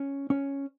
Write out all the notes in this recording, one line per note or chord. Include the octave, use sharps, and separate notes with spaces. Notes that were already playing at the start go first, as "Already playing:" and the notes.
Already playing: C#4
C#4